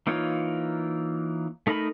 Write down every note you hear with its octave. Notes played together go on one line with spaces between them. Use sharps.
E3 A#3 D#4 F4 C#5
A3 D#4 A#4 D#5 B5